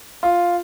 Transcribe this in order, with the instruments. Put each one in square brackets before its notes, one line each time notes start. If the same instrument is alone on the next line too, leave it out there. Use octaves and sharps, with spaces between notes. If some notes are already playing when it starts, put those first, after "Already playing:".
[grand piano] F4